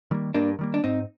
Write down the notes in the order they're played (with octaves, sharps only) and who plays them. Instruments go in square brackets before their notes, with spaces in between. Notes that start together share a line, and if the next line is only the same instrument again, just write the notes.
[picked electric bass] D#3 G3 A#3
[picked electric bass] G2 [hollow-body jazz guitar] A#3 D4
[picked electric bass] D#3 G3 A#3
[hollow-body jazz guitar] D4
[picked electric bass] G#2 [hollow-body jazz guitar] C4 D#4